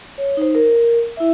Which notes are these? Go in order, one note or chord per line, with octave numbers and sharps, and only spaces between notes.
C#5
D#4 C5
A#4
E4 E5